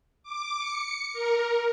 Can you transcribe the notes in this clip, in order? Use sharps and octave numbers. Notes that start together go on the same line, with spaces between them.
D6
C#7
A#4